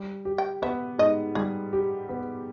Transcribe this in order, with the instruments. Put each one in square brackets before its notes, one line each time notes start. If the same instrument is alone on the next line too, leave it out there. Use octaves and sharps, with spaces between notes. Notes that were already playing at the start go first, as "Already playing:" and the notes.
Already playing: [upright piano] G3
G4
[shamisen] G5
[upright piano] B3 [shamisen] E5
[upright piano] G#2 [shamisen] D#5
[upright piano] G3 [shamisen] G#4
[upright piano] G4
B3